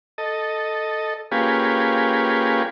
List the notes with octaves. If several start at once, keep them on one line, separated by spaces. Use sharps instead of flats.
A4 D#5
A#3 C#4 F4 G4 G#4 B4